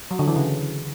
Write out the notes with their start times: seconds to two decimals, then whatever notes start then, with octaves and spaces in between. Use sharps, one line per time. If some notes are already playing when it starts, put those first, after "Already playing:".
0.11 F#3
0.19 D3
0.27 E3
0.36 C#3